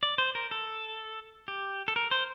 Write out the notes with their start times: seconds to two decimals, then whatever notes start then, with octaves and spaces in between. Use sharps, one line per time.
0.03 D5
0.18 C5
0.35 A#4
0.51 A4
1.48 G4
1.88 A4
1.96 A#4
2.11 C5